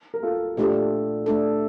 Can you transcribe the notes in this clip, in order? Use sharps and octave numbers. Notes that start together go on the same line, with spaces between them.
A#4
F4 A4
A#2 A3 D4 F4 G4 A4
A3 D4 A4